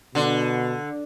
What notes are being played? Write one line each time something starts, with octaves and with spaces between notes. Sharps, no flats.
B2 D3